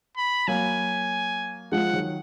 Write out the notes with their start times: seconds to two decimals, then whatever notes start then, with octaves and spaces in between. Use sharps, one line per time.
0.17 B5
0.48 F#3 A#3 G#5
1.72 F3 G#3 F#5
1.93 D#3 F#3